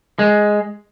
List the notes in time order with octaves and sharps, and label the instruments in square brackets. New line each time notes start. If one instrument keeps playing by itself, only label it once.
[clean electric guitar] G#3